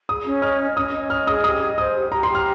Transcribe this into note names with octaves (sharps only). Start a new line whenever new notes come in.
G#4 D#6
C#4
D#5 F6
D#5
C#4 D#6
C#4
D#5 F6
G#4 D#6
G4 D#6
D#5
C5 D#6
G4
G4 A#5
C6
G4
F6